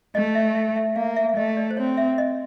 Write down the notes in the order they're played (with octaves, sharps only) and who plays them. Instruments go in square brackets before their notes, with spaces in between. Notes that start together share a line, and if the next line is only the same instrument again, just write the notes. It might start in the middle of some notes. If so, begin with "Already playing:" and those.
[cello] A3 [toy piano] D#5
[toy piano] E5
E5
E5
[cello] A#3 [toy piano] F5
[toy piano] E5
E5
[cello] A3 [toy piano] D#5
[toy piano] D5
C5
[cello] C4 [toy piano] C#5
[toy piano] E5
D#5